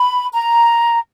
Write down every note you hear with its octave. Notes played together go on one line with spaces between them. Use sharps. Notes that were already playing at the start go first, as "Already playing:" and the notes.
Already playing: B5
A#5